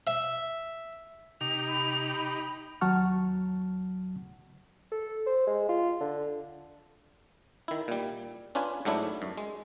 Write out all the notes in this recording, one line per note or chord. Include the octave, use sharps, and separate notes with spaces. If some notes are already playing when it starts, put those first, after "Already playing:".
E5
C3 D#4 G4 F7
B5
D#2 F#3 F#5 A5 C#6 F6
A4
C5
G#3
F4
D3
D#3 E4
A#2 G3
C#4 D4 F4 B4 G#5
G#2 F#3 A3 D4 E4
F#2
G#3